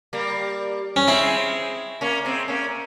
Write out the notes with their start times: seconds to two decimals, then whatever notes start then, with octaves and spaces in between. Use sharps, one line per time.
0.13 G3 A#3
0.96 C#4
1.07 G#3 C4 E4
2.01 A#3 C#4
2.25 G#3 C4
2.48 A#3 C#4